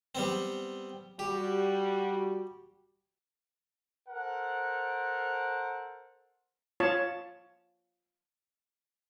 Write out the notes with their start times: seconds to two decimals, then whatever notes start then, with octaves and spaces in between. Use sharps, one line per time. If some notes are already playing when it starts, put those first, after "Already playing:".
0.15 G3 B3 C4
1.19 G3 F#4 G4
4.09 A4 A#4 C5 F#5
6.80 F4 C#5 A5